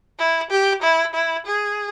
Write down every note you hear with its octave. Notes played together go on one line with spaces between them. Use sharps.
E4
G4
E4
E4
G#4